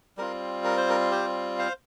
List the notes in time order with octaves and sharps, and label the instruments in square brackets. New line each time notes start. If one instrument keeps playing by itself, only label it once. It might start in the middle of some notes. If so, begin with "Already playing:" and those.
[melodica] G3 C4 F4 A#4
A#4
C5
A#4
G4 C5
C5 F5